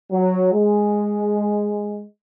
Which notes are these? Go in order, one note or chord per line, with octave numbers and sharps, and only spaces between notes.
F#3
G#3